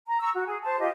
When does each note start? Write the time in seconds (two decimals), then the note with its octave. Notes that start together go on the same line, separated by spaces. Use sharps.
0.07 A#5
0.20 A#5 C#6 E6
0.35 F#4
0.46 G#4
0.62 C5 A5
0.80 F4 G4 D#5